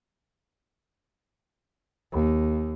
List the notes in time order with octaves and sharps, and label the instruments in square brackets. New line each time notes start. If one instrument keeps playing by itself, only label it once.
[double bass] D#2